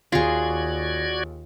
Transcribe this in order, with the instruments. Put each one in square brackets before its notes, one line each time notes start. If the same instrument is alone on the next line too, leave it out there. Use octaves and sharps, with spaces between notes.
[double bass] D#2 [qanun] F4 G#4 [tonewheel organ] F#4 D5 G#6